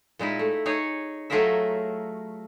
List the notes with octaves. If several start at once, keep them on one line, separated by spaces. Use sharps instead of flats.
A#2 G#3 D#4 E4
A3
D#4 G#4 C#5
F#3 A3 F4 G#4 A#4 E5